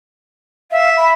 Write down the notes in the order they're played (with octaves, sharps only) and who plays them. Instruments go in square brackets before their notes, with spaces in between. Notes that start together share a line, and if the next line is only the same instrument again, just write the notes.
[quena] E5 [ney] F5
[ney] B5